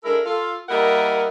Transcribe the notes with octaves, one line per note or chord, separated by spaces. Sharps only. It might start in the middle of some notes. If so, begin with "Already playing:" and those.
G#3 D4 E4 A4 A#4
F4 A4
G3 A#3 E4 A#4 D#5 F#5